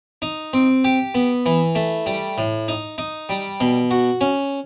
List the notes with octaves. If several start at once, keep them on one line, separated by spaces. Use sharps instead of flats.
D#4
C4
G4
B3
E3
A3
G3
A2
D#4
D#4
G3
B2
F#4
C#4